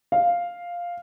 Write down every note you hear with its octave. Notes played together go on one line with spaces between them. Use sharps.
F5